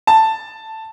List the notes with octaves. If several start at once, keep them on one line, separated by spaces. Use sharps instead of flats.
A5